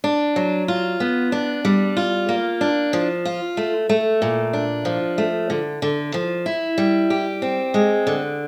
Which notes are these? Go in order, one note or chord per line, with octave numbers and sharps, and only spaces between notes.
D4
F#3
F4
B3
D4
G3
F4
A#3
D4
F3
F4
A3
A3
A#2
D4
F3
A3
D3
D3
F3
E4
G3
G4
C4
G#3
D3